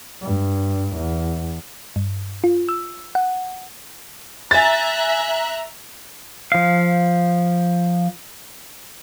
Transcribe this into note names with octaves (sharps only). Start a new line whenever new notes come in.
G2
E2
G2
F4
E6
F#5
E5 G#5 A#5 F#6 A6
F3 F5